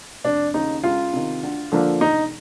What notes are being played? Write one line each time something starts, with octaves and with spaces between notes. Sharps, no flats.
F1 D4
D#2 C#3 D#4
C#2 F4
C3 D#3
D2
D3 F3 A#3 D4
E1 D#4